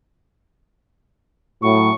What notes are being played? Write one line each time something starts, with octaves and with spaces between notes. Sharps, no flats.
A2 F#3 C#6